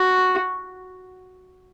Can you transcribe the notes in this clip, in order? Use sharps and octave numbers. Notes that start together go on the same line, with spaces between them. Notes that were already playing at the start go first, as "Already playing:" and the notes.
Already playing: F#4